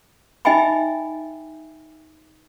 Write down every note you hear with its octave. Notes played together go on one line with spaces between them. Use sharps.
D#4 D#5 E5 G5 G#5 B5